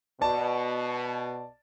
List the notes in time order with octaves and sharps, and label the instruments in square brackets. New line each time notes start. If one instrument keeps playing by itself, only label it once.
[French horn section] B2 [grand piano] D5 A5